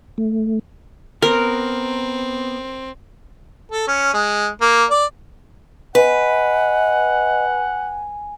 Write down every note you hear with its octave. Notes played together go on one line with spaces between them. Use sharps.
A3
B3 C4 A#4
A4
C#4
G#3
A#3
D5
B4 D#5 F#5 G#5